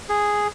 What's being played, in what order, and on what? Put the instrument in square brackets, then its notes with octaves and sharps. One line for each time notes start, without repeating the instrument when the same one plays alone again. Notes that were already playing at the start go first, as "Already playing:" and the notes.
[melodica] G#4